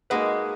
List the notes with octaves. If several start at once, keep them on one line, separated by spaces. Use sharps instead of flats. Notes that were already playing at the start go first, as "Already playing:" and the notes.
G#3 A#3 D#4 F#4 B4